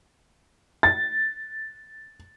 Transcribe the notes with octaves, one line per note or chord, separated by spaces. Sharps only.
A6